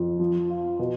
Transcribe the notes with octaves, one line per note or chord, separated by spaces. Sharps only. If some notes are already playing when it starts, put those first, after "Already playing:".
Already playing: F2
F3
F4
B2